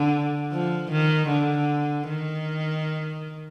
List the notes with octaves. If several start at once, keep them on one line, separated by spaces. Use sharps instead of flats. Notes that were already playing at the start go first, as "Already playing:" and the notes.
Already playing: D3
F3
D#3
D3
D#3